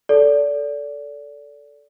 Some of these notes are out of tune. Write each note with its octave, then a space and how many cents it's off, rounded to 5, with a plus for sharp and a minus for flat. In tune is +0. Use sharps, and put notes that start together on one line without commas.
A4 +0 D5 -25